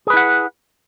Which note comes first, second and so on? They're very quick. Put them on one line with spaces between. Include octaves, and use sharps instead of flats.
G#4 B4 E4 F#5